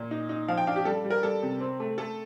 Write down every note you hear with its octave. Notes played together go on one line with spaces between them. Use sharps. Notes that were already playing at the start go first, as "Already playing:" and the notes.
Already playing: A#2
D#4
D#4
F3 F5
G5
D4 F5
G4
G3 A4
G3
A#4
G3 A4
C3
C4
A3
A3 A4